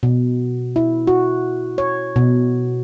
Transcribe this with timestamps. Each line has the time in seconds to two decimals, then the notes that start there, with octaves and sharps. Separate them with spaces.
0.03 B2
0.76 E4
1.07 F#4
1.78 C#5
2.16 B2